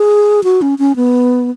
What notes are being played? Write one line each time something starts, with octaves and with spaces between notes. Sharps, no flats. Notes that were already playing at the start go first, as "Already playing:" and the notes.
Already playing: G#4
F#4
C#4
C#4
B3